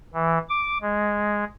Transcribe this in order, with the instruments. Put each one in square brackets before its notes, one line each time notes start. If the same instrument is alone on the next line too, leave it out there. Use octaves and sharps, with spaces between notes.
[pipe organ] E3
D6
G#3